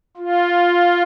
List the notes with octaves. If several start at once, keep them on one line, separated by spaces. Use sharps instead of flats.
F4